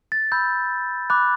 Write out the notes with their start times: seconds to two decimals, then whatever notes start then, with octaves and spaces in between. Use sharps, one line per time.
0.12 A6
0.32 B5 E6 G6
1.10 B5 D6 F#6